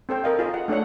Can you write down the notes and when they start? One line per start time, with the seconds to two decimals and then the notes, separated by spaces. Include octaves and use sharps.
0.09 C4 A4 C5 G5
0.24 A#4 D#5 F5
0.39 F4 G#4 D#5
0.54 F#5
0.68 A3 D4 A4 C#5 F#5